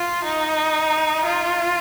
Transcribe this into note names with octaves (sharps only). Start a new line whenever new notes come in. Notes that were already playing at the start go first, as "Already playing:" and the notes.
Already playing: F4
D#4
F4